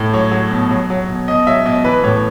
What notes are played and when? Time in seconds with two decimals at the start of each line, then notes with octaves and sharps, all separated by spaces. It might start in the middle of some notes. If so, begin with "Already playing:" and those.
Already playing: A2
0.13 F#3 C#5
0.32 F#3
0.51 B2
0.71 F#3
0.90 F#3
1.08 B2
1.28 B2 D#5
1.47 F#3 E5
1.66 B2 D#5
1.84 E3 B4
2.03 A2 C#5